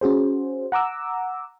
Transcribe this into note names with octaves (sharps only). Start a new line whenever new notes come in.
C#4 F#4 G#4 C5
F#5 A#5 D6 E6